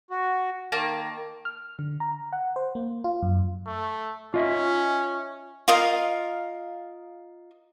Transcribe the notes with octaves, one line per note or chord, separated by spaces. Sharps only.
F#4
D#3 A#3 A5
F6
D3
A#5
F#5
C5
A#3
F4
F#2
A3
C#4 F4 D#5 E5
F4 A#4 D#5 F5